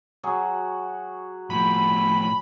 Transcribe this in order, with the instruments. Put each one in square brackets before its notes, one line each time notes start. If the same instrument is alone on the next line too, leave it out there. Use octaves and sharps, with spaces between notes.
[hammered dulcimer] F#3 F#4 G#4
[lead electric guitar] A2 F3 [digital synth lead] B5